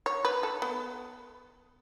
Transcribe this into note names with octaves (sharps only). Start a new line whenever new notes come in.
C#5
B4
A4
B3